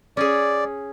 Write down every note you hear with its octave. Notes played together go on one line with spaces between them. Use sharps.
C#4 G#4 D5